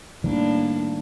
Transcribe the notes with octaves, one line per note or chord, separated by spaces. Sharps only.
A2 D#3 G3 A#3 D4